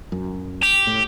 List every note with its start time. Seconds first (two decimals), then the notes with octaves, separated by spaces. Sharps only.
0.12 F#2
0.63 G4
0.87 A2